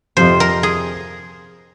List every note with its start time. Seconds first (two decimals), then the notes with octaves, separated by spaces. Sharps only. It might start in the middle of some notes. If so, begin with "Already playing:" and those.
0.17 F2 C3 F3 C5
0.40 A#4
0.63 G#4